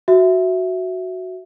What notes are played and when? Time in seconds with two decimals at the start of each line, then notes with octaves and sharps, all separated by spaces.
0.08 F#4 E5